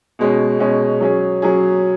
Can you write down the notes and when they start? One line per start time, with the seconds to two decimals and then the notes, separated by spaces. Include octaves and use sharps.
0.19 B2 G#3 C#4
0.59 B2 G#3 C#4
1.01 F#3 C#4 G#4
1.42 F#3 C#4 G#4